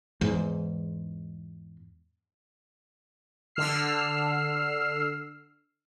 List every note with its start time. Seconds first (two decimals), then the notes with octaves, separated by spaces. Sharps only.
0.21 E2 G#2
3.55 D3 E6 F6 C7